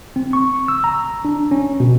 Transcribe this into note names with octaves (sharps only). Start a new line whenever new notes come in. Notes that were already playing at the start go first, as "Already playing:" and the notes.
C4
C#6
E6
A#5
D4
C#4
B2